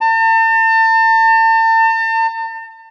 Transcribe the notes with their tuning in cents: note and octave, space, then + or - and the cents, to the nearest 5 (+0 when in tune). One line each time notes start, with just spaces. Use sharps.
A5 +40